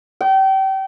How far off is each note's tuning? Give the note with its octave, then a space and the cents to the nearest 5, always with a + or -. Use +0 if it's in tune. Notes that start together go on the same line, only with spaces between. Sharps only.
G5 -30